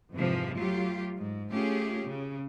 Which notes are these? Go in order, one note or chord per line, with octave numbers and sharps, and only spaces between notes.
F2 G#2 C3 E3 F3
F#3 A3 F4 G4
G#2
A3 C#4 F4 G4 G#4
C#3